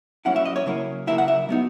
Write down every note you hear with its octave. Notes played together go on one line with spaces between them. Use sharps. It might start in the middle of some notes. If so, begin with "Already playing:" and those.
F#3 A#3 C#4 E4 F#5
E5
D#5
C#5
C#3 F#3 A#3 E4
C#3 F#3 A#3 E4 E5
F#5
E5
F#3 B3 D#4